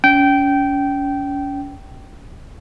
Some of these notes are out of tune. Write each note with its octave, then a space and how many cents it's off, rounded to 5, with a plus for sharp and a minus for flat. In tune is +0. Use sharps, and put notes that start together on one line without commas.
C#4 +35 G5 -15